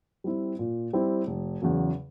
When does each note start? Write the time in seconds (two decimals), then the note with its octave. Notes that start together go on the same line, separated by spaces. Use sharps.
0.24 G3 C4 E4
0.59 A#2
0.93 G3 C4 E4
1.27 F1
1.62 E2 C#3 F#3